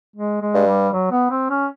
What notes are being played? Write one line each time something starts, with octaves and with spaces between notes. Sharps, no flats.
G#3
G#3
G2
G3
F#3
B3
C4
C#4